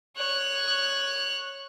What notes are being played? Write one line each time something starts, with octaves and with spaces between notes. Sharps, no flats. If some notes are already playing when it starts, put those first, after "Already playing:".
C#5 F#6